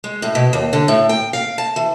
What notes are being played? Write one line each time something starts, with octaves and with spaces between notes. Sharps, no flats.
G#3
A2
B2
D#2
D3
A2
G5
F5
A5
E3